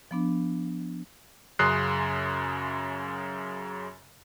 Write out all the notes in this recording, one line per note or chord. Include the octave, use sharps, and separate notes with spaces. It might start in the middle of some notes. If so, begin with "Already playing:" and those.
F3 B3 D4
F#2 C#3 C6 D#6 F#6 C7